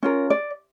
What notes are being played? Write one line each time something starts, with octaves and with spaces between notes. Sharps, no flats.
C#4 F4 A#4
D5